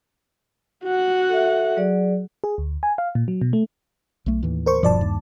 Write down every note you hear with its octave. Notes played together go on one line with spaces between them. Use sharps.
F#4 F#5
A4 E5
F#3 G#4 D5
G#4
D2
G#5
F5
A#2
F#3
B2
A3
B1 A3
D#2 A2 E3
A#4 C5 C#6
D#1 G2 B2 F3 D5 A5
D#2